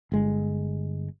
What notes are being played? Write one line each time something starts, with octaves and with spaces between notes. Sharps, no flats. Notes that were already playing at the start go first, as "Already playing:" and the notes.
G1 G#3